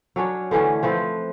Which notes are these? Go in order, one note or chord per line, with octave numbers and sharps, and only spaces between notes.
F#3 C#4 D4 C#5
D3 E3 A3 C#4
F3 A3 C4 B4